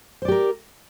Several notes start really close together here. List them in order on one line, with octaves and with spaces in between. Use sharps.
C5 D5 G4 A#4